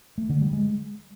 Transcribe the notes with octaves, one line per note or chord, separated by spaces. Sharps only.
A3
D3
G3
G#3